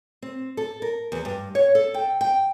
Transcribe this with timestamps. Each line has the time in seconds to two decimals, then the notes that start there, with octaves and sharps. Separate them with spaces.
0.22 C4
0.57 A4
0.82 A#4
1.12 E2
1.25 G2
1.55 C#5
1.75 A4
1.94 G5
2.21 G5